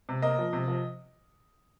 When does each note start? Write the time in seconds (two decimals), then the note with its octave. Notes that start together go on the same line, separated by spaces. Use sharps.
0.09 C3
0.22 A#3 D#5
0.39 F3
0.53 C3
0.68 F3